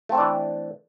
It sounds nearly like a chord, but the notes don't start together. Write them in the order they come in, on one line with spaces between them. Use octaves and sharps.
A3 C4 A4 D4 E3